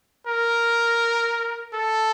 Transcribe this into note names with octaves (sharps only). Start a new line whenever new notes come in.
A#4
A4